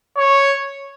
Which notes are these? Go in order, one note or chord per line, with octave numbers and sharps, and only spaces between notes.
C#5